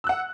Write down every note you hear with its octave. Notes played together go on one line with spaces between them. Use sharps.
F#5 E6 F#6